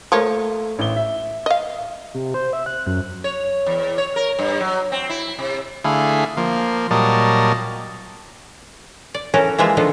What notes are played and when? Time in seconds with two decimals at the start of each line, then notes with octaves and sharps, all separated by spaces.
0.12 F3 A3 A#3 C#5
0.79 A1 G7
0.96 E5
1.46 D#5 F5
2.14 C3
2.34 C5
2.53 E5
2.66 F#6
2.87 F#2
3.24 C#5
3.66 E2
3.98 C#5
4.16 A#4
4.39 G2
4.60 F#3
4.92 C4
5.09 E4
5.39 C3
5.84 D3 A3 E4 G#4 F5 B5
6.37 F3 A#3
6.91 A#2 F#3 G3 A#4 D#5 A5
9.14 D5
9.34 E3 F#3 C#4 A4 A#4
9.59 E3 F3 G#3 A#3 F4 E5
9.77 D3 D#3 F3 B3 F4 A4